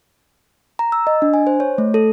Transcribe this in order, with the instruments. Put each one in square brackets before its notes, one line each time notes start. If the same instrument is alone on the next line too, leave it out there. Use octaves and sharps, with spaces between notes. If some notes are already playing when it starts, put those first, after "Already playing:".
[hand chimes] A#5
E6
D#5
D4
G#5
C5
C#5
A3
A4